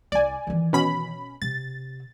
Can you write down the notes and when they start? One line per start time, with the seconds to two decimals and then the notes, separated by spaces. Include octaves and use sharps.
0.12 C2 D5 G#5
0.47 D#3 E3
0.73 B2 C#4 B5
1.42 C3 A6